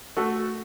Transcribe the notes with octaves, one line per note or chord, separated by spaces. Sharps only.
A3 F#4 A4